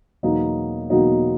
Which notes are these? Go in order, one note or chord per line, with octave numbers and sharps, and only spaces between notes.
E2 B2 F#3 A#3 D#4
E2 B2 F#3 A#3 D#4